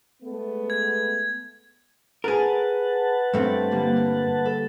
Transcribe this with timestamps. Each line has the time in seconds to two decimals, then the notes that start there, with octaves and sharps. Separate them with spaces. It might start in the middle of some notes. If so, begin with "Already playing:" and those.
0.23 G#3 A3 B3
0.70 G#6
2.24 G#4 A#4 B4 F#5 A5
3.34 G2 A3 C4 G5
3.71 D3 G3 A#3
3.96 A#4
4.46 A4